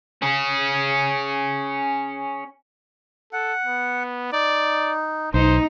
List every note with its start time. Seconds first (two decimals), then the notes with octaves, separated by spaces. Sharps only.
0.22 C#4 G#4
3.33 A4 F#5
3.65 B3
4.33 D#4 D5
5.34 B1 D#4 C5